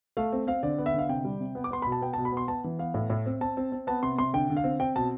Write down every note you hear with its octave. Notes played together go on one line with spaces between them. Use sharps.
A3 F5
C4
C4 F5
D3 D5
B3
E5
D3 F5
C3 G5
G3
C3
B3
D6
B3 C6
B2 B5
A5
B3 G5
A5
B2
B5
B3 C6
B3 A5
E3
B3 F5
A2
A2
C4
C4 A5
C4
C4
B3 A5
C3 C6
C3 C6
D3 G5
D3
F5
C4
C4 G5
B2 A5